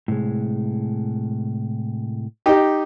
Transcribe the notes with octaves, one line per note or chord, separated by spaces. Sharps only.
A2 C3 G#3
D#4 G4